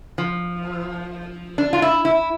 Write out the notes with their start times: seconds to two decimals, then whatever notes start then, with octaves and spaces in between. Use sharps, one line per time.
0.18 F3
1.58 D4
1.73 F4
1.82 E4
2.05 E4